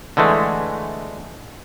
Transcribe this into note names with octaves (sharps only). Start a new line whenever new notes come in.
D3 E3 G#3 A3